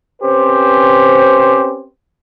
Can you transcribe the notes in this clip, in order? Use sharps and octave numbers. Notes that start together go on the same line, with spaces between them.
C4 C#4 G4 B4 C5